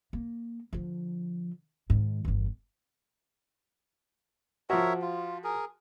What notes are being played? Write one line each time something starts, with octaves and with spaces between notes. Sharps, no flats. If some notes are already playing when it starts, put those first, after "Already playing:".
A#3
D3 F3
G#2 D#3
G1 E2
F3 F#4 A#4 C#5 E5
F4
G#4 A#4